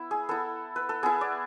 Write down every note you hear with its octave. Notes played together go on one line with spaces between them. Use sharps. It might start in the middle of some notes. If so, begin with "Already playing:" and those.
Already playing: B3 E4
G#4
B3 E4 A4
B4
A4
B3 E4 G#4
D5